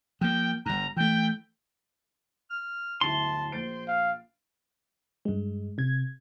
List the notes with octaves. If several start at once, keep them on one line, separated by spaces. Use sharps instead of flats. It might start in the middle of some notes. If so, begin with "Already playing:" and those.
F3 A#3 G5
G1 G2 A#5
E3 A3 G5
F6
D1 G1 E4 A5 C6
A#1 C5 A6 D7
F5
G2 G#3
C3 G#6